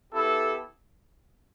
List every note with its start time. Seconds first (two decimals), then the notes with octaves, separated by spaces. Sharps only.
0.12 B3 E4 G4 A4